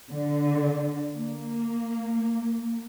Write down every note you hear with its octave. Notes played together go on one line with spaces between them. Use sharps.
D3
A#3